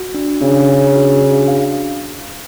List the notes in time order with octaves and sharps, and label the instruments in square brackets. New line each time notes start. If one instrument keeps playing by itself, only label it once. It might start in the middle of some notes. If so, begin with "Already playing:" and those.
Already playing: [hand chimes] F#4
D4
[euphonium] C#3 [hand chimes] D4
[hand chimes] D4
F#4
D4
F5